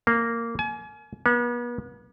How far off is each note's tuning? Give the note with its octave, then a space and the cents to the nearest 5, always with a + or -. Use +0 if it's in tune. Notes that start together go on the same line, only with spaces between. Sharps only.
A#3 -10
G#5 +35
B3 -40